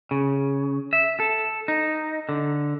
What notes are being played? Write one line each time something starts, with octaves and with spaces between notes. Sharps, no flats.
C#3
E5
A4
D#4
D3